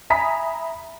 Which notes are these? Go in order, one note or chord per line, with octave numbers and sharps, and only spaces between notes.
E5 G#5 A#5 B5 D#6 B6